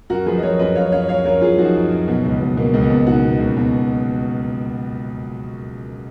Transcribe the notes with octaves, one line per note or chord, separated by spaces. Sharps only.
F#2 F#4 A#4
F3 G#4 B4
D#5
F3 A#4 C#5
F#2 B4 D#5
F#2 C#5 F5
F#2 C#5 F5
F#2 C#5 F5
F#2 A#4 C#5
F#2 F4 G#4
F3 D#4 F#4
F#2
F#2
B2
C#2
B2
B2 A#3
C#2
B3
B2
B2 D#4 F#4
B2
C#2
B2